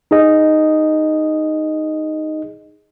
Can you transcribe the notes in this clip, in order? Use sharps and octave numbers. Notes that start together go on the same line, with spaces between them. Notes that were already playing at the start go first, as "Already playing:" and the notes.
D#4 G#4 D#5